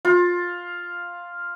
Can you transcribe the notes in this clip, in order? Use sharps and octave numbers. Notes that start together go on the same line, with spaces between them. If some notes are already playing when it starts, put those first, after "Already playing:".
F4